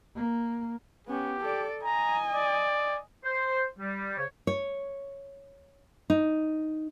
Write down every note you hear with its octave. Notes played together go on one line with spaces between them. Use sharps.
A#3
B3 C#4 G4
A4 D5
D#5 G#5 A#5
D5
C5
G3
C#3 C5 C#5
C#5
D#4